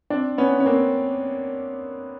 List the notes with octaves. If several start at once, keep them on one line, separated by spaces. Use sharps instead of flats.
C4 D4
B3 C#4
C#4
A#3 C4